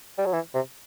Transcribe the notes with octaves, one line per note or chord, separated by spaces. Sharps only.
G3
F#3
E3
C3